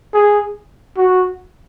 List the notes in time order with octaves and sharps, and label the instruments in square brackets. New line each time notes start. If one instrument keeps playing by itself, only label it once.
[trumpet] G#4
F#4